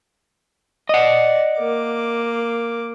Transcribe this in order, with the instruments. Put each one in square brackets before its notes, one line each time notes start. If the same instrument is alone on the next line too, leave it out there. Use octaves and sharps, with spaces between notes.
[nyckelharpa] D5 [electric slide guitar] D#5 F#5
[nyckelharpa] A#3 D6